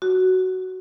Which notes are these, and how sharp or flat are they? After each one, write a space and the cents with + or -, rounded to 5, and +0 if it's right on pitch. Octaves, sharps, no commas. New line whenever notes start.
F#4 +10